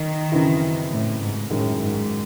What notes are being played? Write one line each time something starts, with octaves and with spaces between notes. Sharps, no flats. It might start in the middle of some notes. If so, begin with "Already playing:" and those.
Already playing: D#3
F#2 C#3 E3 C4 E4
A2
G#2
F#2 A2 D#3 G#3
G#2